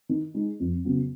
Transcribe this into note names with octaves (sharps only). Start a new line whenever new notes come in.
D#3
G#3 D#4
F2
C#3 F#3 B3